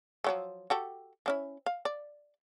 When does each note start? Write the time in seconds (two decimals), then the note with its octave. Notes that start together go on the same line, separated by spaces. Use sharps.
0.24 F3 F#3 A3
0.70 F#4 G4 A4
1.26 F3 C#4 E4
1.66 F5
1.85 D5